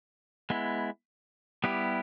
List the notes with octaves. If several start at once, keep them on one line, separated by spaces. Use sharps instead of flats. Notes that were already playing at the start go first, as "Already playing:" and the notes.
G#3 B3 E4
G3 B3 E4 G4